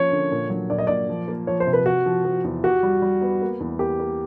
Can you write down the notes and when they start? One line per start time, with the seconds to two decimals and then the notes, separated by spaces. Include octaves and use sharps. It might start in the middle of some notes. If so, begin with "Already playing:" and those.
Already playing: F3 A#3 C#4 C#5
0.12 D3
0.32 A#2
0.50 F#3
0.70 A#2 D5
0.78 D#5
0.87 A#2 D5
1.09 F3
1.28 A#3
1.47 F3 C#5
1.60 C5
1.67 C3
1.73 B4
1.85 C3 F#4
2.06 F3
2.25 F3
2.44 E2
2.63 F#4 G4
2.83 G3
3.02 G3
3.21 B3
3.42 A#3
3.60 E2
3.79 A#3 G4
4.00 A#3